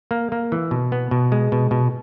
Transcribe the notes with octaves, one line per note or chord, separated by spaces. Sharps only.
A#3
A#3
E3
B2
B3
B2
G#3
B2
B2